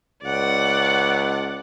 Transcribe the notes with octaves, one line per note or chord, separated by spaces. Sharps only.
C#2 D5 F#5